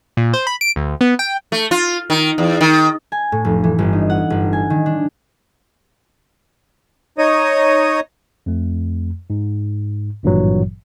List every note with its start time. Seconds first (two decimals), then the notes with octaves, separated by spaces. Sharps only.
0.17 A#2
0.34 C5
0.47 B5
0.61 D7
0.76 D2
1.01 B3
1.19 G5
1.52 A3
1.71 F4
2.10 D#3
2.38 E2
2.61 D#3
3.12 G#5
3.32 A2
3.45 F1
3.64 E3
3.79 G1
3.93 D#4
4.10 F#5
4.30 G1
4.53 G#5
4.70 D#3
4.86 D4
7.18 D#4 C#5 D#5 D#6
8.46 F2 A3
9.30 G#2
10.23 G#1 G2 A#2 E3 F#3